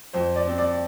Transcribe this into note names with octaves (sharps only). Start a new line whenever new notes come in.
F2 C5
D5
C4
D5